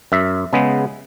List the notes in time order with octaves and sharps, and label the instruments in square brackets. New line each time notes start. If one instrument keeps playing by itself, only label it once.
[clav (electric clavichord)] F#2 E5
C#3 G#3 B3